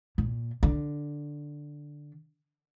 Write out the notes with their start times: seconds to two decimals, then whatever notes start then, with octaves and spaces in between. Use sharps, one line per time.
0.18 A#2
0.63 D3